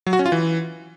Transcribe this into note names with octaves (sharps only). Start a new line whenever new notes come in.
F#3
F#4
C#4
F4
E3